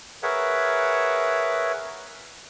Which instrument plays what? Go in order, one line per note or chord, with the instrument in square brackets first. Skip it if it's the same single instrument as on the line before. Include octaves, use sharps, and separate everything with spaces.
[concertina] G#4 A#4 B4 C#5 E5 F#5